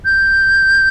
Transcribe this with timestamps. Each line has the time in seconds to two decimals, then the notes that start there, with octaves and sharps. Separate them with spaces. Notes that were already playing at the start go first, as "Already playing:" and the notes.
0.05 G6